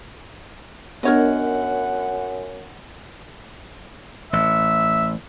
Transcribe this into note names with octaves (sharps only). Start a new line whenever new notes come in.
F#2 B3 D4 A#4 C#5 D#5 F#5
A1 E5